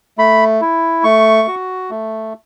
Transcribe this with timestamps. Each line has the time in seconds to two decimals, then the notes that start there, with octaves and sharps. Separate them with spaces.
0.18 A3 B5
0.61 E4
1.04 A3 C#6
1.48 F#4
1.90 A3